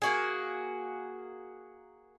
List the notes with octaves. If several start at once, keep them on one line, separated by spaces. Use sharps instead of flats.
A#3 F#4 G#4